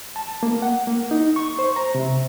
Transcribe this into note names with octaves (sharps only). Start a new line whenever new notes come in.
A5
A#3
F#5
A#3
D#4
C#6
C5
A#5
C3